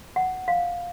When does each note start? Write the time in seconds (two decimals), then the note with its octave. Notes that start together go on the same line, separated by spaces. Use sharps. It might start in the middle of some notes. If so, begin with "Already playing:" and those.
0.16 F#5
0.48 F5